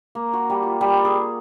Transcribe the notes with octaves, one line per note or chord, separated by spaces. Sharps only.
A#3
F#4
G3
F4
G3
G#4